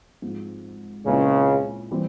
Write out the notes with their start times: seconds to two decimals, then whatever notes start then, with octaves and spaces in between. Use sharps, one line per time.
0.22 G#2 F3 C4
1.05 C#2 A#2 C#3 G#3 C4 E4 G#4
1.91 E3 G3 C4